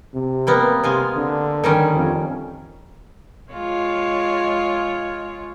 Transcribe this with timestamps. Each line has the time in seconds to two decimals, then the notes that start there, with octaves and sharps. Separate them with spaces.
0.14 C3
0.47 G3 A#3 B3
0.84 C3 G#3 F4 G#5
1.17 D3
1.64 D#3 G3 C#4
1.96 F2
3.52 G#3 F4 C#5